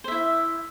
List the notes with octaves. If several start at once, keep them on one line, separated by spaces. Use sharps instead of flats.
E4 C5 E5